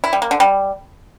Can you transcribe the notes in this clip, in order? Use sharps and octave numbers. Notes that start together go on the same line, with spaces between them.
E4
G3
A#3
D3
G3